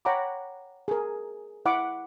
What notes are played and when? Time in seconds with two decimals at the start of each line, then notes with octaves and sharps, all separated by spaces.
0.05 C#5 F#5 G5 A#5 B5 D6
0.88 G#4 A#4
1.65 E4 F#5 B5 D6